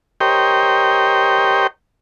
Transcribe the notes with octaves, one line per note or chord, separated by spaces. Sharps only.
G4 A#4 C5 C#5 D#5 G5